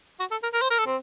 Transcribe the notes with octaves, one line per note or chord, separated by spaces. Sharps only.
F#4
A4
A#4
A#4
C5
A#4
A4
C4